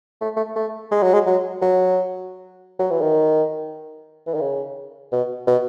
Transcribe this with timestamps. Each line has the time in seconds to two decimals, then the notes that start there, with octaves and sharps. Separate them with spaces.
0.21 A3
0.36 A3
0.56 A3
0.91 G#3
1.03 F#3
1.14 G#3
1.26 F#3
1.62 F#3
2.79 F#3
2.90 E3
3.01 D#3
4.27 E3
4.34 D#3
4.41 C#3
5.12 B2
5.47 B2